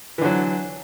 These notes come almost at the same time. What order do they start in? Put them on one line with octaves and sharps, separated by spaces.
E3 D3 F#3